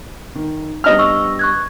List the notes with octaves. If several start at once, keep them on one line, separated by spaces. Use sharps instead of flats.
D#3
G3 B3 D4 D#5 F6
C#6 E6
C#6 F#6 G#6